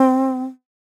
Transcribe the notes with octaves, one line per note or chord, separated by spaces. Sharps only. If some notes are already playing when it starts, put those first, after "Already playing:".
Already playing: C4